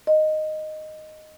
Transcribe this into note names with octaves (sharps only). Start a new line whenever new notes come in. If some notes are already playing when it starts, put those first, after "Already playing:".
D#5